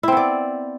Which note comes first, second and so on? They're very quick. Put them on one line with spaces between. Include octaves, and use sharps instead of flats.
E4 C4 B3 D5